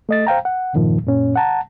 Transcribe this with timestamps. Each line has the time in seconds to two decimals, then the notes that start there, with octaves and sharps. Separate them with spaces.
0.09 A3 D#5 A6
0.27 C5 F5 G5 A#5
0.45 F#5
0.73 E2 G2 A#2 D#3 F3
1.04 F#2 A#2 C#4
1.36 F#5 A5 A#5